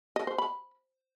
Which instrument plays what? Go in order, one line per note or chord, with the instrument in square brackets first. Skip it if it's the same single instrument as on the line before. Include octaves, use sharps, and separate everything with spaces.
[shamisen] D#5
C5
B5